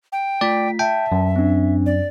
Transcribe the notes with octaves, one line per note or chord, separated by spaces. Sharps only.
G5
A3 F4 D5 B6
E5 G5 A5
F#2
C4 D4
D5